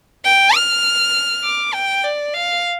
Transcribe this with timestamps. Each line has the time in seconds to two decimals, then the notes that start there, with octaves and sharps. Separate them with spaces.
0.25 G5
0.55 F6
1.44 D6
1.74 G5
2.04 D5
2.34 F5